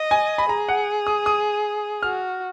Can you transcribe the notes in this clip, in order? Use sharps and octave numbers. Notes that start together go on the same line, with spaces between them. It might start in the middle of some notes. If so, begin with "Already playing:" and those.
Already playing: D#5
G#5
B5
G#4 A#5
F#5
D#6
D#6
F#4 F6